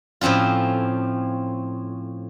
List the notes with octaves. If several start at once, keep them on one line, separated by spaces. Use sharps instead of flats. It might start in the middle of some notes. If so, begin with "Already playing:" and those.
A2 F3 C4 C#4 F4